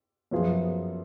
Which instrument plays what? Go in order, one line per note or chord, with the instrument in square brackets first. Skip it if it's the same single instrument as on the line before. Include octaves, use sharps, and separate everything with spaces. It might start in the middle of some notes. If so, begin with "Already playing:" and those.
[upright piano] F#2 F3 B3 F4 G#4